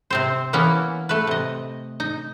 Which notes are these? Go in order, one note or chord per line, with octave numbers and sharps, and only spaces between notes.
C3 C4 C5
E3 A#3 B3 C#4 E4
A3 B4
C3 D#5
D#4